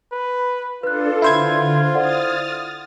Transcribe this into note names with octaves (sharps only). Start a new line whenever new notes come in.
B4
D4 F4 A4 B4 F#6
D3 E4 C5 G#6
A4 D5 F#5 D#6 F6 A6